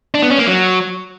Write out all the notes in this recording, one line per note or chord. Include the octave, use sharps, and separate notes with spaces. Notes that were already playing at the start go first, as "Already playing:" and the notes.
D4
B3
C#4
A#3
F#3